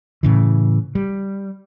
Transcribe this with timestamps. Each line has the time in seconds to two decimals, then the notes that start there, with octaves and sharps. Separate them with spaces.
0.23 A2 C#3 E3
0.95 G3